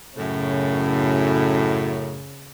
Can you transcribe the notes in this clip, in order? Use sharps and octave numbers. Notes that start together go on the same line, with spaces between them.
F#2 A2 C#3